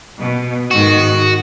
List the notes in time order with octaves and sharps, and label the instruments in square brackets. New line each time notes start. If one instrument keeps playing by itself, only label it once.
[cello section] B2
[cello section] G#2 D#3 [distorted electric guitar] F#4